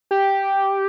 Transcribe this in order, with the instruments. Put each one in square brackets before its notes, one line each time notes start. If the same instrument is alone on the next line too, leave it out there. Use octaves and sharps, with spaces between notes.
[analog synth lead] G4